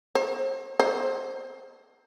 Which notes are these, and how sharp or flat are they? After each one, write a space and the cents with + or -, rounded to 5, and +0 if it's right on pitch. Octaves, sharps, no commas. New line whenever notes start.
C5 +40
C5 +15